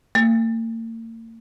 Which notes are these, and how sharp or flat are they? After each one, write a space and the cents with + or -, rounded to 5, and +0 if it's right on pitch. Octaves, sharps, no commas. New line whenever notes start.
A#3 -45